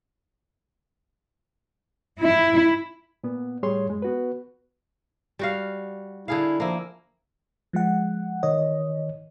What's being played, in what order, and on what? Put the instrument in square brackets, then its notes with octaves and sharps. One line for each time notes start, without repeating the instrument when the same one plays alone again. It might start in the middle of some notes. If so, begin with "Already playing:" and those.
[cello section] E4
[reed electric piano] A#2 B3
A2 G3 G#4 C#5 C6
F#2 G#3
B3 F#4 B4
[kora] G3 F#4 F5
[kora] D3 G#4 F5 [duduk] E4
[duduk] F3 [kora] A#3 E4
[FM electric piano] F3 G#3 F#5
[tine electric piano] D#3 C#5 [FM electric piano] D#5